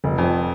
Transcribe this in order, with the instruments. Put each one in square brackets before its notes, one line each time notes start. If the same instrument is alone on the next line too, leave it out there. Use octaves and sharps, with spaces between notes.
[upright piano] F1
F2